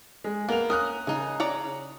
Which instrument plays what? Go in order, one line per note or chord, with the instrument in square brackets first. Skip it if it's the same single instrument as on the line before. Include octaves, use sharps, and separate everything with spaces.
[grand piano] G#3
[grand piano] A#3 F7 [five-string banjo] B3
[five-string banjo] C#4 A#4 [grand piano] D#6 F#6
[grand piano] C#3 [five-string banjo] D#4 G#4
[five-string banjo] C#5 D5 A#5